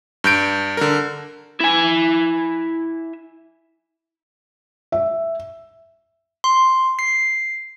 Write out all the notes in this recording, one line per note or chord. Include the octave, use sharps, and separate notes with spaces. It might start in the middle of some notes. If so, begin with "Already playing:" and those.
G2 G6 D7
D3 A#4
E4 G#5
E5
C6
C7